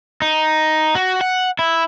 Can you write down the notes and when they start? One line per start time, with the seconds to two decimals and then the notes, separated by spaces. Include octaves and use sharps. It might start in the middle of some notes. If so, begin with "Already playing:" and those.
0.22 D#4
0.95 F#4
1.21 F#5
1.59 E4